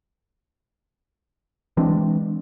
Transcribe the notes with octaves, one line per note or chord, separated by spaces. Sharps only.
E3 G#3 C4 D4